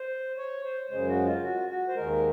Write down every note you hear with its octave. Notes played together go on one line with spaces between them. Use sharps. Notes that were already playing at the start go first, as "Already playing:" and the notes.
Already playing: C5
C#5
C5
F#2 C#3 G#3 C5
F#4
F4
F#4
F#4
C5
D#2 D#3 G#3 A#4